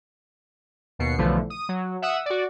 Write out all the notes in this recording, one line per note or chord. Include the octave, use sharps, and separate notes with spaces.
D#2 B2 C7 C#7
B1 D3 E3 F3 A3
D#6
F#3
E5 F#5 D#6 E6
F#4 D5